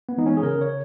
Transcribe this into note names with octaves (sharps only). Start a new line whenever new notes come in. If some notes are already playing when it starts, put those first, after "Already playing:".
B3
E3 G#3 D#4
C#4
G#4
C#3 A#4
C#5